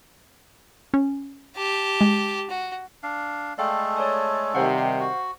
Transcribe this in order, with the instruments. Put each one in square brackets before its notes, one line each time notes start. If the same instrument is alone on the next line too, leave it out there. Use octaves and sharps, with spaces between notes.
[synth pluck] C#4
[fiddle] G4 A5
[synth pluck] G#3
[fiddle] F#4
[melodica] D4 F5
[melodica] G#3 A3 A4 [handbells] D5 F5 G5
[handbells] C#5 D5 G#5
[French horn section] C3 D#3 G3 [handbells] C5 F5 F#5
[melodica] F#4